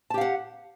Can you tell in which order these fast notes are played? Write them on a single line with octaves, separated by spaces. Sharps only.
A5 G4 F5 F#5